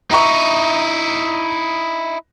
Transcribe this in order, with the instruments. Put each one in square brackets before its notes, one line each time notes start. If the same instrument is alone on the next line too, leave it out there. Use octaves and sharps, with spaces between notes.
[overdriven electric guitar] D#4 E4 [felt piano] E5 A#5 C#6